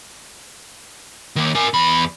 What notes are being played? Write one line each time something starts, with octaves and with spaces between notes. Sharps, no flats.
D#3 A#3
A#4 G#5
E2 B5